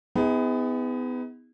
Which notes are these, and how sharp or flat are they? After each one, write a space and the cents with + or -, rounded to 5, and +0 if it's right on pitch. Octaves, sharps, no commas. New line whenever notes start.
B3 +25 D#4 +45 G#4 -25